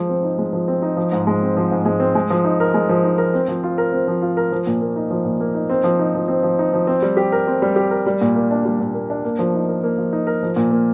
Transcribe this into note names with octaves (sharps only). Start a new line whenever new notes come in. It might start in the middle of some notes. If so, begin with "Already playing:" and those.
Already playing: F3 G#3
C4
D#4
G#3
F3
C4
D#4
F3
G#2
G#3
C4
F3
G#2
G#3
C4
G#3
F3
D#4
A#4
G#3
F3
D#4
A#4
C4
F3
F4
A#4
C4
F3
F4
A#4
F3
A#2
A#3
D#4
F3
A#2
A#3
D#4
C4
F3
D#4
F3
C4
F3
D#4
F3
C4
G3
G4
A#4
C4
G3
G4
A#4
G3
A#2
A#3
D4
G3
A#2
A#3
D4
A#3
F3
D#4
A#4
A#3
F3
D#4
A#4
F3
A#2
A#3